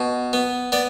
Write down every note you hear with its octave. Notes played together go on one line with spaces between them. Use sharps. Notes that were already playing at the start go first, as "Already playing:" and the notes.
Already playing: B2
B3
B3 D5